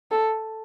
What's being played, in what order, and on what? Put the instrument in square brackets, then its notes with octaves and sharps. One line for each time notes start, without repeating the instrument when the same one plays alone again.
[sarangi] A4